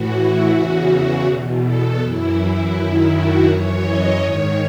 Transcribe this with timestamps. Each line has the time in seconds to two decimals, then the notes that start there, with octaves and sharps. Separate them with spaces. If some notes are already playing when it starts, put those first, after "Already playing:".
Already playing: A2 E3 F#4
0.13 E4
0.51 E2 C#3 E3 F#4
1.25 E2 B2
1.62 A4
1.98 F#2 E3 E4
2.34 E4
2.72 F#2 D#3 E4
3.09 F#4
3.45 F#2 E3 C#5
3.82 D#5
4.19 G#2 D#3 C#5